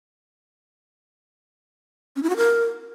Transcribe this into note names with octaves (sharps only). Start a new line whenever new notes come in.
C#4
E4
F#4
A#4